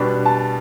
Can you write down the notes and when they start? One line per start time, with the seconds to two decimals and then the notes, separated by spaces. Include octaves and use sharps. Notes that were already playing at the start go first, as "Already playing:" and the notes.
Already playing: B2 G3 D4 B5
0.25 A5